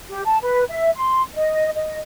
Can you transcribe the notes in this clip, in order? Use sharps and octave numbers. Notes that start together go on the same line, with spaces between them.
G4
A5
B4
E5
C6
D#5
D#5